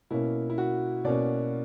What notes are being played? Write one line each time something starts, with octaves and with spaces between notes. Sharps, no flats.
B2 A#3 C#4 E4
E4
F#4
B2 A#3 C#4 D5